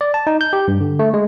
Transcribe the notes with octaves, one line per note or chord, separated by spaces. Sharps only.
D5
A5
D#4
G6
G4
G2
D3
A3
G#3